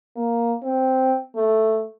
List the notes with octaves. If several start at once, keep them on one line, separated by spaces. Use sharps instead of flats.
A#3
C4
A3